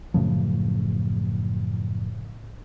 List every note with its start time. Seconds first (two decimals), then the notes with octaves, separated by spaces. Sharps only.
0.14 F#2 A2 C#3 F3